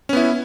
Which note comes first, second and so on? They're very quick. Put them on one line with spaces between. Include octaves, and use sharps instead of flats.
C#4 B3 E4